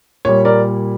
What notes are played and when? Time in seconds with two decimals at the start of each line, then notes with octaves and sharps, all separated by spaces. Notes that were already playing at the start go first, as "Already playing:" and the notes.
0.25 A#2 G3 C#5
0.45 A#4 D5